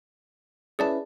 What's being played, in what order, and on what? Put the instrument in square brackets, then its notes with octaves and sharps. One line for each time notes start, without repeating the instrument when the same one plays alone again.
[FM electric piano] C#4 E4 B4 [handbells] G#4 D5 A5